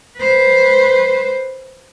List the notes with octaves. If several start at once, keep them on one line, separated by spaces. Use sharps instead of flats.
B4 C5